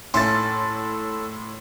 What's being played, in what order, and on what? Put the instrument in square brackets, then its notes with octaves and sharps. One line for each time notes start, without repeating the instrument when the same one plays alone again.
[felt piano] A2 [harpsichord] A3 A#3 C#4 [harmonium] A4 [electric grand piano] C6 A6